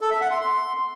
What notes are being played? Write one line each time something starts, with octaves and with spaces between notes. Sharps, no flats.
A4
E5
F#5
C6
C6